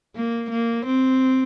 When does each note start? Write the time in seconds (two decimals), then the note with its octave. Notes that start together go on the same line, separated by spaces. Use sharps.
0.15 A#3
0.50 A#3
0.85 C4